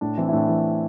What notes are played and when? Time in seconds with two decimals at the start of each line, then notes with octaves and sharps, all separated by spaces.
0.01 A2 D4
0.18 E3 C4
0.29 E4
0.33 A2 D4
0.49 E3